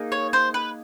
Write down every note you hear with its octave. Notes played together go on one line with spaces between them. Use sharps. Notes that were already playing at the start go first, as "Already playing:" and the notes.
Already playing: A#3 D#4 G#4
C#5
C5
B4